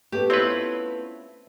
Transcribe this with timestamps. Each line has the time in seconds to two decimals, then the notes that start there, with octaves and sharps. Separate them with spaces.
0.12 A3 B3 C#4 G4
0.30 C4 E4 F4 B4 C#5